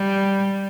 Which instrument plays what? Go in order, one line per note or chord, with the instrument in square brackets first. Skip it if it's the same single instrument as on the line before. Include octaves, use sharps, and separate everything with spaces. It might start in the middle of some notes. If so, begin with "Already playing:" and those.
Already playing: [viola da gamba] G3